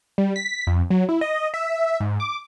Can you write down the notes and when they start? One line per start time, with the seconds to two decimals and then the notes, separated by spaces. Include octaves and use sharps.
0.18 G3
0.36 B6
0.67 F2
0.91 F#3
1.09 E4
1.21 D#5
1.54 E5
2.00 G#2
2.20 D6